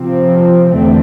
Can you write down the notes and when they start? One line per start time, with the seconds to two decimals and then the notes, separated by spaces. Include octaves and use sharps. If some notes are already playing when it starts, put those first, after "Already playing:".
Already playing: C3 F3 C4
0.71 E2 D3 A3 C4